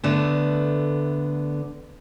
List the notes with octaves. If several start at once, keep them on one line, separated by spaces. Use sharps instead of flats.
D3 A3 B3